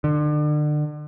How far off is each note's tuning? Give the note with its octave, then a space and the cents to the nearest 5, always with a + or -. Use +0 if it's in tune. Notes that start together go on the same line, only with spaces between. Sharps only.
D3 +35